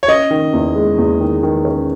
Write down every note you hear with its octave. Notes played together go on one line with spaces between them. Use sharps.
C#5
C#4 D#5
D#3
E2
G#3
E2
D#3
D#3
C#4